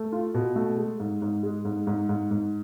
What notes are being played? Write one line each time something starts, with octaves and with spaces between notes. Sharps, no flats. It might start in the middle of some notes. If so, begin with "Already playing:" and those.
Already playing: A3
F4
B2
A3
G#3
G#2
G#2
G#3
G#2
G#2
G#2
G#2